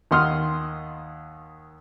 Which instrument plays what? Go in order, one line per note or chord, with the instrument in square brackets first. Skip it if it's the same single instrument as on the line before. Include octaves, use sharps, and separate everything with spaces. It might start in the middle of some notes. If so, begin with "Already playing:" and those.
[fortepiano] D#2 D#3 F#5 C6 D#6 F6